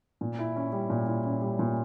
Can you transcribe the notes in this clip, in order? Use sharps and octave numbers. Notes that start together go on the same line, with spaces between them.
A#2
E4
C#4
G3
A#2
E4
C#4
G3
A#2